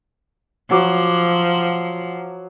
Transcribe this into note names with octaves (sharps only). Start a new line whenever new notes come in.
F3 F#3 D6